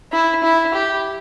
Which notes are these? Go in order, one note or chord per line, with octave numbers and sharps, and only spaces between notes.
E4
E4
G4